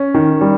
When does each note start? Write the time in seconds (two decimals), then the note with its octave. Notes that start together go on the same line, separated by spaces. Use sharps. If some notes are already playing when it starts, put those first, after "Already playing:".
Already playing: C#4
0.14 D#3
0.41 G3